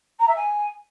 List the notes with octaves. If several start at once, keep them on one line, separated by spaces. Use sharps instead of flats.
A#5
E5
G#5